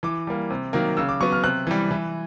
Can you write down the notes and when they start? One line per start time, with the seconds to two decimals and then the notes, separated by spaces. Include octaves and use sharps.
0.03 E3 D6
0.27 G3 A#3
0.50 C3
0.73 D#3 F#3 A#3
0.97 C#3 E6
1.09 D6
1.21 F#3 B3 C#6
1.32 F6
1.43 C3 F#6
1.67 E3 G3
1.91 E3